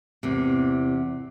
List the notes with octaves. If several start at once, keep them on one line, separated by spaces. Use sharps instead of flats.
E2 C3